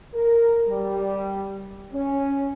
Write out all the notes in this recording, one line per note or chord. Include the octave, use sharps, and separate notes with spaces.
A#4
G3
C#4